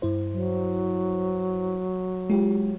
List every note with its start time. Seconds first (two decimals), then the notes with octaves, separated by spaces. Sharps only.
0.02 G2 E4 C5
0.31 F#3
2.30 G#3 F4 G4